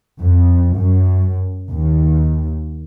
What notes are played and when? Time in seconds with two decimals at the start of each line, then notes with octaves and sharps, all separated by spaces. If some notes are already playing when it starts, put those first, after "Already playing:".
0.20 F2
0.77 F#2
1.70 D#2